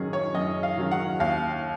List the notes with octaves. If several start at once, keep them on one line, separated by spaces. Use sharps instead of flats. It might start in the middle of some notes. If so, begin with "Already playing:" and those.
Already playing: F#2 D#3 F#3 C#4 G#4
C#5
F#2 D#5
F5
D#3 F#3 C#4
F#5
D#2 F5